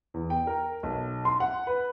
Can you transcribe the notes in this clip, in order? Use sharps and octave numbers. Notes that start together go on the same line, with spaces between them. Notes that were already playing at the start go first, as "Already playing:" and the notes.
E2
G5
A#4
B1
C6
F#5
B4